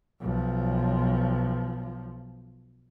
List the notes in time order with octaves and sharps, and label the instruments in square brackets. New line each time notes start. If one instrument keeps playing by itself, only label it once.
[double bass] B1 F3